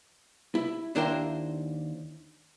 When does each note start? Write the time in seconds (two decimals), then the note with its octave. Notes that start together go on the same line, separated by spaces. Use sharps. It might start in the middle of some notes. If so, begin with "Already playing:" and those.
0.55 E4
0.95 D#2 D4 E4 A#4 C5 G5